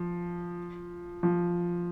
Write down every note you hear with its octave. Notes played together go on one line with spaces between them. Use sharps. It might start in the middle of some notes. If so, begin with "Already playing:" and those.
Already playing: F3
F3